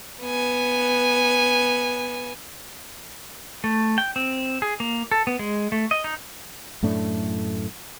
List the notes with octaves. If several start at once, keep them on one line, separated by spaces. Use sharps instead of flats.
B3 G#5
A3
G5
C4
G#4
A#3
A4
B3
G#3
A3
D#5
D#4
F#2 A2 A3 D4